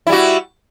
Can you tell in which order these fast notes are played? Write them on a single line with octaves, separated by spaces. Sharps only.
E4 G3 F#4